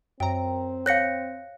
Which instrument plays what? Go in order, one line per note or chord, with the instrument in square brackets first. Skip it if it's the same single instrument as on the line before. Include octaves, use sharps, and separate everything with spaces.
[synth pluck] F#2 A#5 [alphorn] C4 [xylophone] G5
[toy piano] C#5 F5 [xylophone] F#6 A#6 C#7